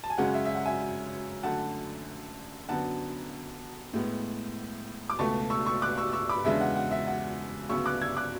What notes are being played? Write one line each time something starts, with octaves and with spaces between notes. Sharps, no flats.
A5
G#5
F#2 C#3 G#3 C#4 F#5
E5
E5
F#5
E5 G#5
F#2 D3 A3 F#5 A5
F#2 D3 F#3 B3 F#5 A5
A2 G#3 B3
D6
C#2 B2 A3 A5 C#6
C#6 E6
C#6 E6
D6 F#6
C#6 E6
C#6 E6
B5 D6
E2 C#3 G#3 D4 E5
F#5
F#5
E5
F#5
D2 C#3 F#3 B3 C#6 E6
D6 F#6
E6 G#6
D6 F#6